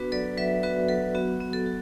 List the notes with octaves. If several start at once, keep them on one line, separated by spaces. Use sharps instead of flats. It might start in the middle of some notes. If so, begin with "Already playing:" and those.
Already playing: B3 D4 F#4 B4
F#3 A4 D5
F#3 B4 E5
B3 F#4 B4
F#3 A4
B3 F#4
B3
A4
F#4